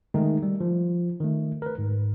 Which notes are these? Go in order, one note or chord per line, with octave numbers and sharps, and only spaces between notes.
D#3 G#3 A3 D#4
G3
F3
D#3 A3
A#4 B4
G#2